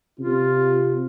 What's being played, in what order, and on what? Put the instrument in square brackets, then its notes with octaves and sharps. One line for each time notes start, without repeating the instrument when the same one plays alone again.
[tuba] C3 [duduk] F4